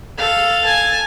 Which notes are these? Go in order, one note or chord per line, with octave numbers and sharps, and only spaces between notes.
A4 F5
G#5 A5